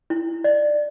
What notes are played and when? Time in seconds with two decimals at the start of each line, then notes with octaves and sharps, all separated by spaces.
0.10 E4
0.44 D5